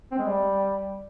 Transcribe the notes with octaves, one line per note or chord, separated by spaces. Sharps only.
C4
G#3
G3